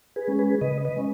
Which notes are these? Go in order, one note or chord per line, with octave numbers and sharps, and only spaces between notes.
G#4 B4
G#3 C#4
G#4 B4
C#3 B4 D#5
B4 D#5
G#3 C#4